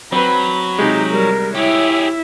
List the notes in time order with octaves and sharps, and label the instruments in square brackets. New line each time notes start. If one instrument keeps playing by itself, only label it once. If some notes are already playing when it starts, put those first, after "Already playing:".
[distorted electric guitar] F#3 [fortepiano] C4 B4 [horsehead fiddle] B5
[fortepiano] C3 G#3 [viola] D#4 G4
[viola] G3 [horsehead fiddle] A#4
[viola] E4 E5 [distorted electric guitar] G4 G#4 [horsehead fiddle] C#5